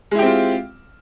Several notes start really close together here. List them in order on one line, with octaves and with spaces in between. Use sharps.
G#3 E4 G4 C4 F4